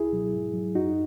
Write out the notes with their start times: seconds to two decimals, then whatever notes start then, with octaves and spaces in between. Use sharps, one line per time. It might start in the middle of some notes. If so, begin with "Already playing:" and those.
Already playing: C#2 E4 G#4
0.12 B2 F#3
0.33 G#2
0.54 F#3
0.75 F#2 D#4 F#4